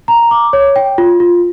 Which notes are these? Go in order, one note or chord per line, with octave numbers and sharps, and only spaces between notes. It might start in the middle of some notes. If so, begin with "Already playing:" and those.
A#5
D6
C#5
G5
F4
F4